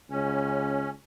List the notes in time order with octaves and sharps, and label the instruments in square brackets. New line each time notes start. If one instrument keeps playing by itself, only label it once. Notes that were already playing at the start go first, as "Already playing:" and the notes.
[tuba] C#2 [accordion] C#4